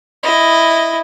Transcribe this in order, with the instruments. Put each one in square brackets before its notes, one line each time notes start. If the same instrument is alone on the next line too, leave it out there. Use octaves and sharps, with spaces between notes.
[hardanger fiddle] E4 D#5